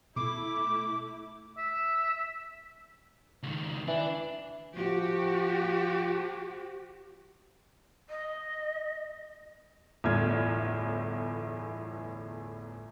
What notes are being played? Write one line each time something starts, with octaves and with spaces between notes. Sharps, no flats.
B2 A3 E4 D6
E5
C#2 D#3
E3 D4
F3 F#4 G4
D#5
G1 E2 A2 F6 G#6